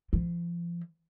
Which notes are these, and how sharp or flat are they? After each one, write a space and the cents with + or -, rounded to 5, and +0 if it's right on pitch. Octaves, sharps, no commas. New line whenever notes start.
F3 -30